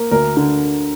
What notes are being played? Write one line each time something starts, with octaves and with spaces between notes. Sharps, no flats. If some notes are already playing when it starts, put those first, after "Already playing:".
Already playing: A#3
D2 A#4
D3